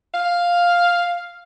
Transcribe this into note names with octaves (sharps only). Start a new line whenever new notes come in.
F5